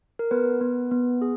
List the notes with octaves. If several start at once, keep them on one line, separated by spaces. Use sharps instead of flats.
A#4
B3 B4
B3
B3
G#4